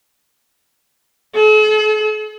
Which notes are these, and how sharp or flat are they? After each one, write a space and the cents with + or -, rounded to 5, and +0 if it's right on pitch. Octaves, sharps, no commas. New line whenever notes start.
A4 -45